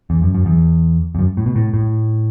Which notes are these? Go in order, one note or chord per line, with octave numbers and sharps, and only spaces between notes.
E2
F#2
F#2
E2
E2
F#2
A2
B2
A2
A2